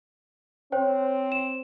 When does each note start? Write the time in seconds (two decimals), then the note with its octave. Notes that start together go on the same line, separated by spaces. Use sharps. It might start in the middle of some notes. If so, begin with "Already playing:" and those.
0.72 C4 C5 C#5 G5
1.32 E7